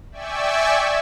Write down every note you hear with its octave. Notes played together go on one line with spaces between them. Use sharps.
D5 E5 G5 G#5 C#6 E6